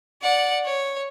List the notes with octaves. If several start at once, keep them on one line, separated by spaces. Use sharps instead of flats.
D5 F#5
C#5